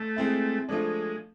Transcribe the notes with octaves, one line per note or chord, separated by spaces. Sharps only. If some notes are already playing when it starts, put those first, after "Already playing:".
Already playing: A3
G#3 C4 E4
F3 G#3 A3 D4